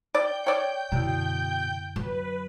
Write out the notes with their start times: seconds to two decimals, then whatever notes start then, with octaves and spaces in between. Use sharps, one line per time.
0.15 D5 G5 G6
0.47 C#5 D5
0.92 F#2 B2 D3 E4
1.96 F#3 B4